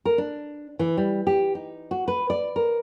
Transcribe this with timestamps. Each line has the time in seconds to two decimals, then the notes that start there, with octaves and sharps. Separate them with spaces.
0.05 A#4
0.18 D4
0.79 E3
0.97 G3
1.27 G4
1.55 D#4
1.91 F#4
2.08 B4
2.30 D5
2.56 A#4